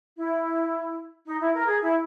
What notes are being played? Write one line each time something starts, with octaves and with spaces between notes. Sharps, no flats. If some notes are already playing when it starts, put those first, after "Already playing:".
E4
D#4
E4
A#4
G#4
E4